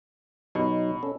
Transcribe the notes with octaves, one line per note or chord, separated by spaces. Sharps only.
B2 F#3 D#4
C#4 A4